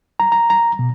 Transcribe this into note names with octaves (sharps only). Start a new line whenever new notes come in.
A#5
A#5
A#5
B2